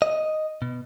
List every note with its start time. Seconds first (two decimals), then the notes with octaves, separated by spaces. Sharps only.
0.02 D#5
0.62 B2